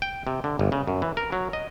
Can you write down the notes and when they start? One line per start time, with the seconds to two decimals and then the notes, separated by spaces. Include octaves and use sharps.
0.02 G5
0.27 C3
0.44 D3
0.59 G1
0.72 C#3
0.87 F#2
1.02 E3
1.17 A#4
1.32 F#3
1.53 D#5